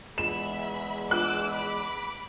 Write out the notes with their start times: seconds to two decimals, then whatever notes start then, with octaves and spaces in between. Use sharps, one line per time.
0.18 E2 G#3 E5 B5 E7
1.11 D6 E6 F#6
1.53 B5 D6